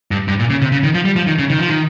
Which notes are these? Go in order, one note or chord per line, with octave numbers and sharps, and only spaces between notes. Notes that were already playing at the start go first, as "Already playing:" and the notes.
G2
G2
A#2
C#3
C3
C#3
D#3
F3
G3
F3
D#3
C#3
D#3
F3
D#3